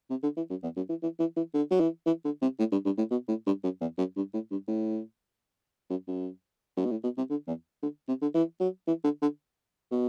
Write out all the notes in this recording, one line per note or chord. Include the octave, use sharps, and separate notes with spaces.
C3
D3
E3
F#2
E2
F#2
E3
E3
E3
E3
D3
F#3
E3
E3
D3
C3
A2
G2
G2
A2
B2
A2
G2
F#2
E2
F#2
G2
A2
G2
A2
F#2
F#2
F#2
B2
A2
B2
C3
D3
E2
D3
C3
D3
E3
F#3
E3
D3
D3
B2